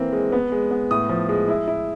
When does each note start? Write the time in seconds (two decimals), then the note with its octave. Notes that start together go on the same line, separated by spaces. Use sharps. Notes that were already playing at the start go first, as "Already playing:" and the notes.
Already playing: E3 A#3 C4
0.13 G#3
0.32 B3
0.52 G#3
0.71 B3
0.91 A2 D#6
1.09 F3
1.29 G#3
1.48 E4
1.68 E4